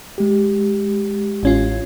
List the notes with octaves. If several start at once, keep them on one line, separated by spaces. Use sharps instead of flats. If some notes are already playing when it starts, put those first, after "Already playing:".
G#3 G4
A1 C#4 F4